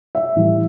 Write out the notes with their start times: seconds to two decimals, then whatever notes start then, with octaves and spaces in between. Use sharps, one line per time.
0.15 E5
0.36 A2 E3 G3